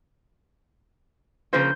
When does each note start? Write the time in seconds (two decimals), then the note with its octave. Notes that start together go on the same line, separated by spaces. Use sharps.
1.53 C#3 F3 A#3 C5 G6